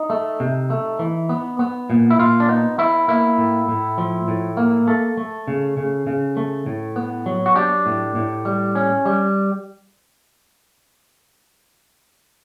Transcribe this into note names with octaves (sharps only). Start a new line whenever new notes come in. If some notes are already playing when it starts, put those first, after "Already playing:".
Already playing: D#4
A3
C3
A3
E3
B3
B3
A#2
E4
A#2 F4
D4
B3 D#4
B3 E4
A#3 E4
A2
A2
F3
A2
A#3
A3 A4
A3
C#3
C#3
C#3
A3
A2
B3
F#3
F#4
D4 G4
A2
A2
G3
C#4
G3